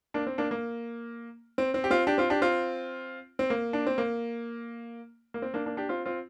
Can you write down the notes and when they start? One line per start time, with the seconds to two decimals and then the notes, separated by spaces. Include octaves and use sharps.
0.14 A#3 D4
0.27 C4
0.38 A#3 D4
0.51 A#3
1.58 C4
1.74 C4
1.84 G4
1.90 C4 F4
2.07 D4 G4
2.18 C4 F4
2.30 D4 G4
2.42 C4 F4
3.39 C4
3.50 A#3
3.73 D4
3.87 C4
3.98 A#3
5.34 A#3
5.42 C4
5.54 A#3 D4
5.66 A#3 D4
5.77 D4 G4
5.89 C4 F4
6.06 C4 F4